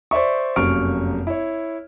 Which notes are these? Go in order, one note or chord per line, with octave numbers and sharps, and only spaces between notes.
C5 D5 E5 C#6
F1 F#2 A#3 C#6 F6 D7
E4 C#5